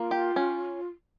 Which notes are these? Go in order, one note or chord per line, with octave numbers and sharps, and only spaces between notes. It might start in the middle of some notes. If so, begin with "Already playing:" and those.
Already playing: A#3 F4
G4
C#4